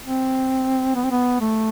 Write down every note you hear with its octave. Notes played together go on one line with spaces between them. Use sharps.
C4
B3
C4
B3
A3